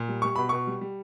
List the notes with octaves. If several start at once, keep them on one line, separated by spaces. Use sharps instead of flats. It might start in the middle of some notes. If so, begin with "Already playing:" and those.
Already playing: A#2
G3
G3 C#6
B2 B5
B2 C#6
G3
G3